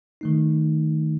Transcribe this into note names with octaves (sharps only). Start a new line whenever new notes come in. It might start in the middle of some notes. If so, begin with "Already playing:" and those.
D#3 A3 D#4